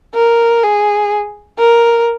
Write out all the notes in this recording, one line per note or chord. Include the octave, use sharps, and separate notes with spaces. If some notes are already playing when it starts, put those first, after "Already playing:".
A#4
G#4
A#4